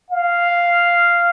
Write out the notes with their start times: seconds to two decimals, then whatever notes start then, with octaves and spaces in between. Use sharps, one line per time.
0.11 F5